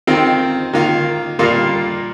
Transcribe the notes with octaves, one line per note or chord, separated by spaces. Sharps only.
D#3 C4 F4
D#3 A#3 F4
A#2 G3 A#3 F4